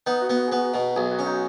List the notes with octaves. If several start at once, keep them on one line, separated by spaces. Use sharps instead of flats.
B3 D#4
F#4
B3
F#4
B3 G#4
F#4
B2
B1 G#4
F#4
C#4
D#4